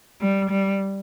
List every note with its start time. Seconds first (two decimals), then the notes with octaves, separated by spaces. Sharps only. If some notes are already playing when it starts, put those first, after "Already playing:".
0.21 G3
0.50 G3